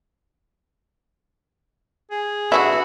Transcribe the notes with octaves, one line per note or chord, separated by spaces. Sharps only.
G#4
D3 E4 F#4 B4 E5